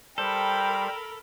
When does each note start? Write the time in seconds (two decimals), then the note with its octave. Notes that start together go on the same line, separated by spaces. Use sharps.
0.18 G3 A4 A#4 C5 G5 B5